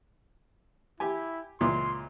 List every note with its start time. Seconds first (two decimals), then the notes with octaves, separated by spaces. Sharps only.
1.00 E4 G4 G#5
1.61 C#2 A#2 E3 C6